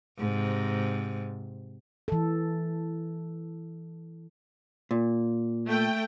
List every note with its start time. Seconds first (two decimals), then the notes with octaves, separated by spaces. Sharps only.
0.19 G#2 C3
2.08 E3 A4
4.91 A#2
5.68 A3 G5